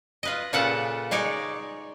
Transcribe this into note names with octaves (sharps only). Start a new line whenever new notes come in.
F4 B4 D#5
A#2 C#3 F4 A4 B4 F#5
G#3 D#4 C#5 D5